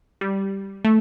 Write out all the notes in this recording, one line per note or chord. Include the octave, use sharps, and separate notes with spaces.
G3
A3